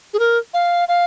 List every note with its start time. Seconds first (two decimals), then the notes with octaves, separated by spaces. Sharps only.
0.14 G#4
0.19 A#4
0.54 F5
0.88 F5